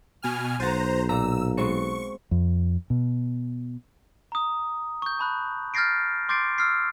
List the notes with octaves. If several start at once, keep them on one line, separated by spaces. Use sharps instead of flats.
B2 G#5 F6
B1 F#4 C5 A#5 A6 D#7
A#2 A#5 E6
G#3 B3 C4 C#6
F2
B2
A#5 D#6
C#6 G6
A5 B5 F#6
F6 G6 A6 A#6 C7 D7
C6 D6 G6 A6 C7 D7
E6 F6 A6 C7